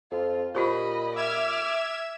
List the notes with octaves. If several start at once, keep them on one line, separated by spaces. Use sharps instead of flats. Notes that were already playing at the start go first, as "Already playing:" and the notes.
F2 F4
A#2 F4 G4 C5 D#5 B5
E5 D6 F6 G#6 E7